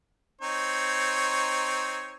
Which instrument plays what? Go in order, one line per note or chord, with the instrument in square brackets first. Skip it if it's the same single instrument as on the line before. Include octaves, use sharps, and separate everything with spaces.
[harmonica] C4 D#4 C#5